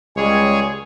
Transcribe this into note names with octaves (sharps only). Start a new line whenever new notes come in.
C#2 G3 G#3 G#4 C#5